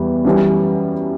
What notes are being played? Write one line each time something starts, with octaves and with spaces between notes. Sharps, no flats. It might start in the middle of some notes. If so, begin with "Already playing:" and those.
Already playing: E2 E3 G3
F#2 E3 G3 C#4